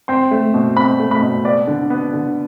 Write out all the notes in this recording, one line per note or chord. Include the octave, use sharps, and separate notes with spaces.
C4 C6
A3
B2
C4 B5
A3
B5
B2
B3 D5
D3
B3
D3